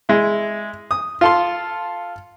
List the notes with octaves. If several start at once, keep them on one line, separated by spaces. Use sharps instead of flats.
G#3 E4
D#6
F4 A4 C6